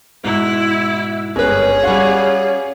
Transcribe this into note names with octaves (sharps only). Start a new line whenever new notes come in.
G#2 B2 E4
G1 G#3 C#4 G#4 B4
G3 F#4 F5 F#5 C#6